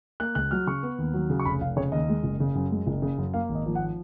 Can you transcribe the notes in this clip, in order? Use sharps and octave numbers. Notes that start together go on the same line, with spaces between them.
A#3 F#6
C#2 F#6
F#3 F6
C#3 C#6
B3
D#2
F#3
C#3
C#6
F1 B5
F1 F5
C#3 C#5
D#2 D#5
G#3
F#1
C#3
F#2
G#3
F#1
C#3
F#2
A#3 F5
G#1
D#5
F3
F#5